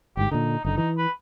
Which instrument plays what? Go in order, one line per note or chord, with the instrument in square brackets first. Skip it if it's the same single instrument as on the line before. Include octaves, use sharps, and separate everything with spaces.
[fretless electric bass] G1 G#2 [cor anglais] G4
[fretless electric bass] A#2 D3 [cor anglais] D#4
[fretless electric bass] F#1 D3 [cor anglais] D#4
[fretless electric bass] E3 [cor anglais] D#4
[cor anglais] B4